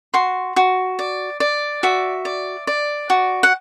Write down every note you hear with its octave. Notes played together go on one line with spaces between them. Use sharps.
F#4 C6
F#4
D5
D5
F#4 E5
D5
D5
F#4
F#5